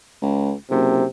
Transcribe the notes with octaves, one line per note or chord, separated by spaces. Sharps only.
C#2
F#1 C3